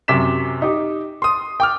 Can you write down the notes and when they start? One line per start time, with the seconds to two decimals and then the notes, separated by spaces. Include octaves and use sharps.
0.08 F#2 C3 D6 B6 E7
0.62 D#4 G4
1.22 C6 D#6
1.60 G5 D6 F6